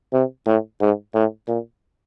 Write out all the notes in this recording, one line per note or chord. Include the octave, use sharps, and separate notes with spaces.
C3
A2
G#2
A2
A#2